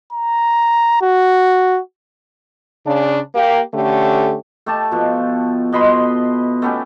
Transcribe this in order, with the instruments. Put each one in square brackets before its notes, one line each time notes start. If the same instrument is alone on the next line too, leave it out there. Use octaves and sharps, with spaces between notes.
[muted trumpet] A#5
F#4
[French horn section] C#3 D4
A#3 G4
D3 A3 C#4 G4
[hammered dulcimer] A3 G4 A5
B2 F3
B2 D#5 B5 C6
A3 B3 C#4 G4